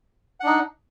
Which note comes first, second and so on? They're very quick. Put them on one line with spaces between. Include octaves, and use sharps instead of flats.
F#5 D4 D#4